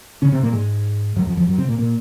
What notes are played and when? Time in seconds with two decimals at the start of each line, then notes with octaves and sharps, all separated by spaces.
0.22 C#3 C#4
0.32 C3 C4
0.42 A#2 A#3
0.53 G#2 G#3
1.16 F#2 F#3
1.27 F2 F3
1.37 F2 F3
1.47 F#2 F#3
1.58 C3 C4
1.68 A#2 A#3
1.78 A#2 A#3